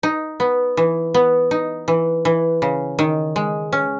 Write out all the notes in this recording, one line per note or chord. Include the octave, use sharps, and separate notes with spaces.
D#4
B3
E3
B3
D#4
E3
E3
C#3
D#3
G#3
C#4